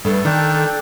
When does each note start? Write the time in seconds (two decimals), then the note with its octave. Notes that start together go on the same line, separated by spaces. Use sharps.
0.05 G2 A3 B3 A4
0.25 D#3 D4 D5 G5